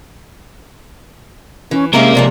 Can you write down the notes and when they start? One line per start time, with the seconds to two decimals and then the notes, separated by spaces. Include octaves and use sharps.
1.71 E3 C#4
1.93 C3 G#3 A#3 C#4 A#4 E5
2.15 C3 F3 G#3 D5